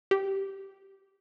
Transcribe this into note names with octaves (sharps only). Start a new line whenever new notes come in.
G4